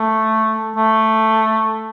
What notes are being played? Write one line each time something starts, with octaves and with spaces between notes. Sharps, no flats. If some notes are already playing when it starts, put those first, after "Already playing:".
Already playing: A3
A3